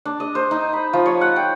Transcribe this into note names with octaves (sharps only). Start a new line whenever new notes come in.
D4
D#5
C5
D#4
B5
F3
C#5
F#5
G5